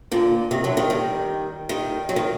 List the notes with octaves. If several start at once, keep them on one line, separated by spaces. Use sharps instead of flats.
A#2 D3
C3 D#3
D3 F#3
D#3 G3
D#3 G3
D#3 G3
F#3
D#3